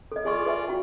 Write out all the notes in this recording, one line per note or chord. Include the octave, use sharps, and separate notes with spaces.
A4 D#5
F4 G#4 D5 G#5 C#6
B4 E5 G#5
F#4 G5